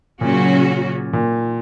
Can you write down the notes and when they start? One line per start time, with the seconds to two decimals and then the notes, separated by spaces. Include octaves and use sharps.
0.21 A#2 C#3 F#3 C#4 F#4
1.13 A#2